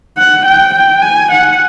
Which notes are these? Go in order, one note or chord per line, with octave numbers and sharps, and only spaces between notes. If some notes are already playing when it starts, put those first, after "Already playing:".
F#5
G5
G5
G#5
F#5